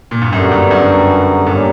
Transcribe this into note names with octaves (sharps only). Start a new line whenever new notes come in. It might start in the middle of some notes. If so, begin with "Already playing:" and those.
A#2
G2
F#2 D3 G3 B3 F#4 A#4
G2
F#2
G2 A#2 G3 C#4 G4 A#4